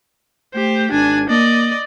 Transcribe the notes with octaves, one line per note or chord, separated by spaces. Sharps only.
A3 G4 C5
G#1 D4 G#5
A#3 D5 D#5